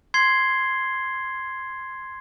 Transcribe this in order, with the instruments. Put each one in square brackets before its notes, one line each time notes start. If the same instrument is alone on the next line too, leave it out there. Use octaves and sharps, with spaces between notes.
[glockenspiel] C6 G#6 C7 G7